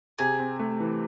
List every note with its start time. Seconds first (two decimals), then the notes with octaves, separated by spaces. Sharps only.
0.19 C3 G#4
0.39 C4
0.59 A3
0.80 E3